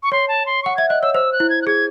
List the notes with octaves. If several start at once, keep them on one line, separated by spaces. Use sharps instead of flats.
C#6
C#5 C6
A5
C6
F#5 C#6
E5 G#6
D#5 F#6
C#5 E6
C5 E6
F#6
E4
G#6
F#6
G#4 G#6